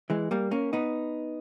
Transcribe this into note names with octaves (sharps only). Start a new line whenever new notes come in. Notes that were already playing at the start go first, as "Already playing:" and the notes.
E3 G#3
G3 A#3
A#3 C#4
B3 D#4